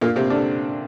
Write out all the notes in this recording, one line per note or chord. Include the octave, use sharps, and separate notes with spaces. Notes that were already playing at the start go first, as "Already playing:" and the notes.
A#2 A#3
C3 C4
D3 D4